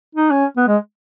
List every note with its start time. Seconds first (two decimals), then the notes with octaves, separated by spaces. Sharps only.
0.15 D#4
0.31 C#4
0.57 B3
0.67 G#3